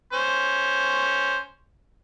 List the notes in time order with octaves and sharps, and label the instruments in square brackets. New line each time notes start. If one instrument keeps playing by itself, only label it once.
[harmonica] C#4 C5